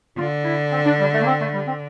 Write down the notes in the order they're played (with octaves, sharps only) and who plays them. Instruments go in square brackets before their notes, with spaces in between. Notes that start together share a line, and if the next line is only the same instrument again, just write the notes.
[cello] D3 [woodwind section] F4
[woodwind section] E4
C4
D4
G3
A3
A#3
C4
A3
G3
C4